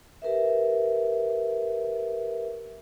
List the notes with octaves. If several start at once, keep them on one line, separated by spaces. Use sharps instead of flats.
G4 A#4 B4 E5